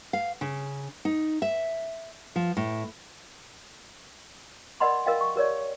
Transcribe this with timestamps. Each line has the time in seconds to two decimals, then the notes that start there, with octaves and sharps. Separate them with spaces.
0.13 F5
0.41 C#3
1.05 D#4
1.42 E5
2.36 F3
2.57 A2
4.80 A#4 D5 D#5 F#5 B5 C6
5.06 A#4 D#5 F5 G5
5.21 C#6
5.36 G4 A#4 C#5 D5